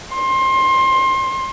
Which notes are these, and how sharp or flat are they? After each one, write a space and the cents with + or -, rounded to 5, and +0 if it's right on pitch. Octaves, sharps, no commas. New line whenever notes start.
C6 +25